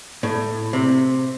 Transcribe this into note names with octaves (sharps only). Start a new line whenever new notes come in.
A2
C3